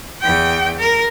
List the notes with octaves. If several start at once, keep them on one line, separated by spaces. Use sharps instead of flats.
E2 G5
A#4